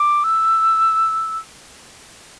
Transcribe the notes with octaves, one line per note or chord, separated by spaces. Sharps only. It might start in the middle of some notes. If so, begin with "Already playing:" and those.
Already playing: D6
E6